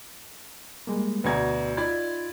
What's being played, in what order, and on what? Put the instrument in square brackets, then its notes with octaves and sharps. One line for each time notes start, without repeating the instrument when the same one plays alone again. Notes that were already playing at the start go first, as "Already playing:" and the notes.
[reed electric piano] G3 G#3 A#3
[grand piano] D2 B2 G#6 [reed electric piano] B4 D5 A#5
[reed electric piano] D#4 F4 G#6 [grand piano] D5 B5